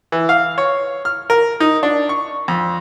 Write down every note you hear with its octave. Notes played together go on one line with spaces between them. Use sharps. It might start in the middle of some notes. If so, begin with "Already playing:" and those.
E3
F5
C#5
F6
A#4
D#4
D4
C#6
F2